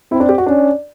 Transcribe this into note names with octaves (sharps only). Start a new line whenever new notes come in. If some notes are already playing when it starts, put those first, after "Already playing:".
C4 E4
D4
G4
F#4
C#4 D4